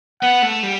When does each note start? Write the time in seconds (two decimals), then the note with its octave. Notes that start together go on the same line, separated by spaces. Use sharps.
0.22 B3 F#5
0.42 A3
0.63 G3